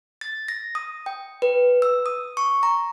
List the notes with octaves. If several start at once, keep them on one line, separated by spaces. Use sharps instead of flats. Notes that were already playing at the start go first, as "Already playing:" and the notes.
A6
A#6
D#6
G5
B4
E6
D#6
C#6
A#5